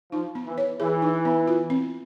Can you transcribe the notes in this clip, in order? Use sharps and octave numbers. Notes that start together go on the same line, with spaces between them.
F3 D#4
B3
E3
C#5
E3 G#4
D#4
B3
F4
C4